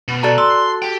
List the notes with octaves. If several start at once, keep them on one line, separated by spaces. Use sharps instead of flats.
B2
F#4 A4 D5 A5 A#5 F#6
C6 E6
G4 G5